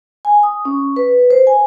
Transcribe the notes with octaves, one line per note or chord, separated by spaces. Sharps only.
G#5
D#6
C#4
B4
C5
G#5